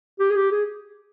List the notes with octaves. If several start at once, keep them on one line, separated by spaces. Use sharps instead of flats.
G4
G#4
G4
G#4